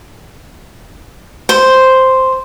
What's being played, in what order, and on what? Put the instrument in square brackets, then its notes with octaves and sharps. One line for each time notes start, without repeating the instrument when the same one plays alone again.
[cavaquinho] C5